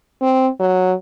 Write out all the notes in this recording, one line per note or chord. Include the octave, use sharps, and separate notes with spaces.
C4
F#3